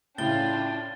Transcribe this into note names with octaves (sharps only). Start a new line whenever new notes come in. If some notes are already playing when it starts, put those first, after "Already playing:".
A2 C#3 D4 F4 G5 A6 G7